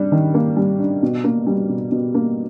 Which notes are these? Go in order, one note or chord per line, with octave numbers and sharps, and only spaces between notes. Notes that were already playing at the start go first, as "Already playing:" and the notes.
Already playing: G3 D4
D#3
A#3
G3
D4
B2
A#3
G3
B2
B2
A#3